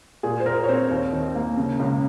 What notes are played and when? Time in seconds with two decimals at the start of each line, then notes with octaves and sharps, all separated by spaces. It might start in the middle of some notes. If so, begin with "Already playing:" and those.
0.23 A#2 G#4
0.40 C5
0.46 A#2 A#4
0.64 C#5
0.68 C4 C5
0.90 D#2
1.13 D#3
1.35 A#3
1.57 C#3
1.79 C#2